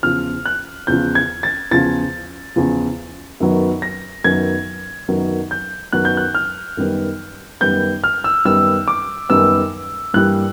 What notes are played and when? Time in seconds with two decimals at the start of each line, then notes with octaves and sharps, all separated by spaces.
0.03 E2 C#3 F3 F6
0.46 F#6
0.87 E2 C#3 F3 G6
1.15 G#6
1.43 A6
1.71 E2 C#3 F3 A6
2.56 E2 C#3 F3
3.40 F#2 D#3 F#3 B3
3.82 A#6
4.24 F#2 D#3 F#3 B3 G#6
5.08 F#2 D#3 F#3 B3
5.51 G6
5.92 F#2 D#3 F#3 B3 F#6
6.05 G6
6.17 F#6
6.35 F6
6.77 F#2 D#3 G3 B3
7.61 F#2 D#3 G3 B3 G6
8.04 F6
8.24 E6
8.45 F#2 D#3 G3 B3 E6
8.88 D6
9.29 F#2 D#3 G3 B3 E6
10.14 G2 E3 G3 A#3 F#6